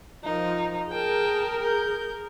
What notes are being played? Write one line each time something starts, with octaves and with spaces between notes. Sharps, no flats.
F3 D#4 A#4
G#4 A#4 G5 A5
G6